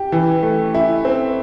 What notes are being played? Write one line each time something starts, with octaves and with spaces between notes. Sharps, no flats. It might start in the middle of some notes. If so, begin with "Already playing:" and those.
Already playing: G4
E3
A3
E4
C4